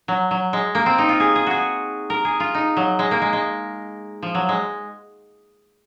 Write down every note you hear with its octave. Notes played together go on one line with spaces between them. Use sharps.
F#3
F#3
G#3
A#3
C4
D#4
F4
G#4
G#4
F#4 G#4
A#4
G#4
F4
D#4
F#3
G#3
A#3
G#3
G#3
F3
F#3
G#3